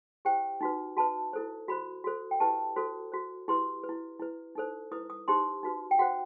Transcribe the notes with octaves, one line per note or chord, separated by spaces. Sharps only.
E4 G4 C5 G5
D#4 F#4 B4
F#4 B4 A5
E4 A4 C5
F#4 C5 B5
F#4 A4 C5
G5
E4 G4 B4 A5
F#4 A4 C5
F#4 C5
E4 G4 B4 C6
B4
E4
E4 B4
D#4 A4 C5
E4 B4 D#6
D#6
D#4 G4 C5 C6
D#4 F#4 B4
G5
F#4 C5 F#5